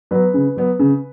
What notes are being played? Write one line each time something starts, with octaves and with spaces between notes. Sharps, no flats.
F#3 B3 B4
C#3
F#3 B3
C#3